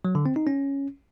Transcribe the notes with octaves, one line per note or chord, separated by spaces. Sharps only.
F#3
D3
C4
D#4
C#4